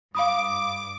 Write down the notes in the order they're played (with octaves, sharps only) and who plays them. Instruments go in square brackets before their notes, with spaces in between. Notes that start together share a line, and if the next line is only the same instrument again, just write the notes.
[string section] G2 D6 [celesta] F5 B5 D#6